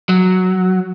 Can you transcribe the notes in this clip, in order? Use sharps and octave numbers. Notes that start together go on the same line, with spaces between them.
F#3